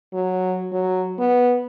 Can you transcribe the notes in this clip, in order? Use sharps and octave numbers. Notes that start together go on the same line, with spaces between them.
F#3
F#3
B3